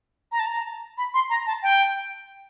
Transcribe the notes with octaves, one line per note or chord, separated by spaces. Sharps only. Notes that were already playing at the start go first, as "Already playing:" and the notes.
A#5
A5
A#5
B5
C6
A#5
A5
G5